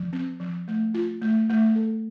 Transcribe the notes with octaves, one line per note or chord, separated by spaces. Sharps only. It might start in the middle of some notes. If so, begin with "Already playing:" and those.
Already playing: F3
C4
F3
A3
F4
A3
A3
A4